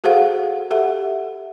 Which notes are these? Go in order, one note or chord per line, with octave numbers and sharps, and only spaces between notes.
F#4 G#4 A4 C5 F5 F#5
G4 A4 E5 F#5